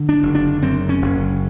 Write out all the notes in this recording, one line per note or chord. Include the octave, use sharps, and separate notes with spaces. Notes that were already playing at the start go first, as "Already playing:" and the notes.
Already playing: D3
D4
F#1
D4
F#2 C4
C#4
F#1